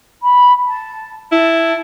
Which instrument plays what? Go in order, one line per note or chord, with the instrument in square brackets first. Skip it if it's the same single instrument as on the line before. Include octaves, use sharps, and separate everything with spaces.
[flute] B5
A5
[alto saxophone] E4 [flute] A5